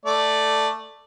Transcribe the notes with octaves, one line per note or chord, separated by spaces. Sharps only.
A3 D5